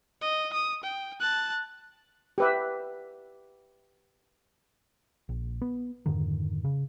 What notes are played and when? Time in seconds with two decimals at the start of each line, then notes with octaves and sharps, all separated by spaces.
0.21 D#5
0.53 D#6
0.83 G5
1.20 A5 F#6
2.38 G4 B4 E5
5.29 A#1
5.62 B3
6.06 F2 G#2 D3 D#3
6.64 C#3